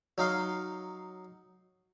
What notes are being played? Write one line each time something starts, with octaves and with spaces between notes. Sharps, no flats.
F#3 D#4 F5 C6